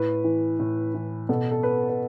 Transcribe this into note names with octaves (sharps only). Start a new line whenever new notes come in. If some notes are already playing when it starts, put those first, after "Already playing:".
Already playing: A2 B4
E3
A2
E3
B2 A4
A4
B4
B4